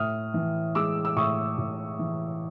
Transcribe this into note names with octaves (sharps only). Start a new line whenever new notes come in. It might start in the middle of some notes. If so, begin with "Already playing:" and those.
Already playing: A2 D#6 F6
E3
G#3 D6 E6
E6
A2 C#6 D#6
A2
E3